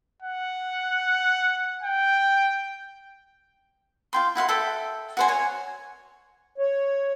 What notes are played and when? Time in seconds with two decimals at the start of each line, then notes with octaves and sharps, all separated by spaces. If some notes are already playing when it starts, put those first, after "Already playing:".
0.22 F#5
1.83 G5
4.13 F4 G5 C6
4.35 E4 F#4 F5 C6
4.48 A4 E5 G5
5.17 F#4 C5 G#5
5.28 C#5 G#5
6.58 C#5